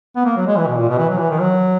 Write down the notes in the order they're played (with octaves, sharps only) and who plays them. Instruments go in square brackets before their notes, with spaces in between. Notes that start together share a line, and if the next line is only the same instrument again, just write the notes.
[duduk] B3
A#3
F#3
G#3
E3
B2
A#2
B2
E3
F#3
E3
D#3
F#3